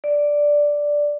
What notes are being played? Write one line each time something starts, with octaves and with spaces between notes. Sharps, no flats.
D5